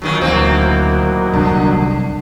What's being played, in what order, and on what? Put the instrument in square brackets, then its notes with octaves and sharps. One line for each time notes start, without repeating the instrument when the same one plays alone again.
[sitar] A#2 D#3 F#3
[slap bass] D2 [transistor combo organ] A#2 D#3 F#3 [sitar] E3 A#3 C4
[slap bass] C2 F#2 [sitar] D3